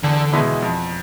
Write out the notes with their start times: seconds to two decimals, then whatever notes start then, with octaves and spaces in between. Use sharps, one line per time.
0.03 E2 D3
0.33 B2 G#3 B3 E4
0.62 F2